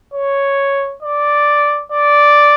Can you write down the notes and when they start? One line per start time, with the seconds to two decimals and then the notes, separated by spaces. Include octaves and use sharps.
0.14 C#5
1.03 D5
1.92 D5